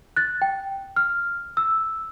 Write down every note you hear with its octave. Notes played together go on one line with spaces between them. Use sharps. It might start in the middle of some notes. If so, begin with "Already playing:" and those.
F#6 A6
G5
F6
E6